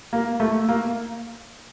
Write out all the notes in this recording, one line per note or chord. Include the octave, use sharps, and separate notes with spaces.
A#3
A3
A#3